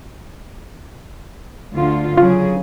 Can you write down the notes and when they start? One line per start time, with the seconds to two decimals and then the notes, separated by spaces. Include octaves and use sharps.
1.74 D2 D3 F4
2.17 C#3 F#3 F4 G#4